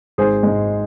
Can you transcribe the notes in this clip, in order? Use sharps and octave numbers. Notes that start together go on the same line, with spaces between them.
G#1 G#4 C5
G#2 G#3